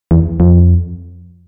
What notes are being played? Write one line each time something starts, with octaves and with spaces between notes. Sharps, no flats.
E2
F2